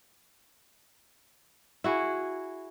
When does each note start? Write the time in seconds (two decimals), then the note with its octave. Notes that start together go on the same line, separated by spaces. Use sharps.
1.84 E4 F#4 G#4